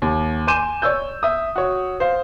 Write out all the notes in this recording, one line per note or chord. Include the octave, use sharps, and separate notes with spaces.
D#2
G#5 C6 D6 G6 D#7 E7
C#5 D5 E6 G6
E5 D#6
F#4 C#5
C5 F5